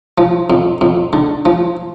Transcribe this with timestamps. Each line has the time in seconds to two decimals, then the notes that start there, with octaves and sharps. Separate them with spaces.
0.18 F3
0.50 F2
0.81 F2
1.13 D3
1.45 F3